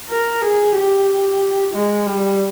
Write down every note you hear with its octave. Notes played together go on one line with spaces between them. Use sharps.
A#4
G#4
G4
G#3
G3